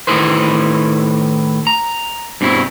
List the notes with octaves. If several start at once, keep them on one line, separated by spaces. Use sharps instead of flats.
A2 D#3 E4 G#4 B4 C5
A#5
G2 B2 C4 E4